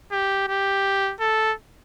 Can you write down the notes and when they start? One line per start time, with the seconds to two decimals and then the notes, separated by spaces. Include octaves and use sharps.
0.12 G4
0.48 G4
1.20 A4